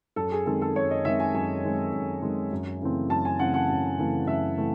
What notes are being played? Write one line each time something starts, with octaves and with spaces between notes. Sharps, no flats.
F#2 A4
G#4
D#3 G#3 C4 A4
A4
F#2 C#5
D#5
D#3 G#3 C4 E5
G#5
F#2 G#5
D#3 G#3 C4
F#2
D#3 G#3 C4
F#2
C#3 E3 A3 C4
F#2 A5
G#5
C#3 E3 A3 C4 F#5
F#5
F#2
C#3 E3 A3 C4
F#2 E5
C#3 E3 A3 C4